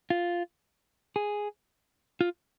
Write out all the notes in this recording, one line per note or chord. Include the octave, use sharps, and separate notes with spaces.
F4
G#4
F4